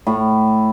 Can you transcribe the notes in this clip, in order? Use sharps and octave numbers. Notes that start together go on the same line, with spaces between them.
A2